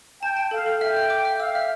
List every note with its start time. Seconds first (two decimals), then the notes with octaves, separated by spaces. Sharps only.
0.22 G5 A5
0.37 A5
0.51 A4 F5
0.66 A4
0.81 E5 G5
0.97 E5
1.10 D6
1.25 E5
1.39 F5 E6
1.55 E5